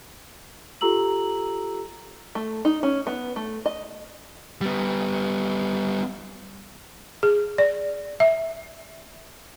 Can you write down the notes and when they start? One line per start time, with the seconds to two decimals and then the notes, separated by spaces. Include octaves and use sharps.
0.81 F4 G4 A4 A#5 E6 F#7
2.35 A3
2.65 D#4
2.83 C#4
3.07 B3
3.36 A3
3.66 D#5
4.61 G3 B3
7.23 G#4
7.58 D5
8.20 E5